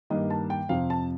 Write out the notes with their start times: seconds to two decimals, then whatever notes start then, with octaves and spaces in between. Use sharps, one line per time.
0.10 G2 D#3 A#3 D#5
0.30 A5
0.50 G5
0.69 F2 C3 F3 F5
0.90 A5